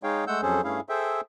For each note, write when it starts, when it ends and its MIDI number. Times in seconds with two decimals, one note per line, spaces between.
0.03 0.25 56
0.03 0.25 63
0.03 0.25 68
0.03 0.25 73
0.03 0.25 77
0.03 0.25 79
0.27 0.41 56
0.27 0.41 57
0.27 0.41 78
0.27 0.41 88
0.27 0.41 91
0.42 0.61 41
0.42 0.61 54
0.42 0.61 61
0.42 0.61 68
0.42 0.61 69
0.42 0.61 72
0.64 0.80 43
0.64 0.80 57
0.64 0.80 61
0.64 0.80 64
0.64 0.80 68
0.64 0.80 77
0.89 1.21 68
0.89 1.21 69
0.89 1.21 72
0.89 1.21 76
0.89 1.21 79